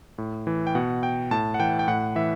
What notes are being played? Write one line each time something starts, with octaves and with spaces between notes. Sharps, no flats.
A2
E3
G5
B2 F#5
G5
A2 A5
F#5
E3 G5
G5
A2 F#5
E3 E5